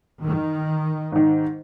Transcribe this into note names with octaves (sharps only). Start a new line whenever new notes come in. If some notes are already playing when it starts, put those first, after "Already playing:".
D#3
G#2 D#3